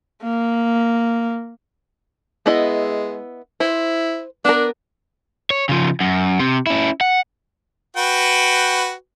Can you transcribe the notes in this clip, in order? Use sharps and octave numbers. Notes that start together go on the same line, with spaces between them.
A#3
G#3 B3 E4 D#5
E4 C5
B3 D4 A#4
C#5
C#3 F3
F#2
C3
C#4 E4
F#5
F#4 B4 G5